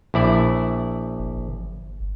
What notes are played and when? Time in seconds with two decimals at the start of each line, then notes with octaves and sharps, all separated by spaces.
0.14 A#1 E4 D5
1.19 G1